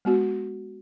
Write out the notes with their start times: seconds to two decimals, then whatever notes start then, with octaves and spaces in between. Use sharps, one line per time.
0.05 G#3 B3 F#4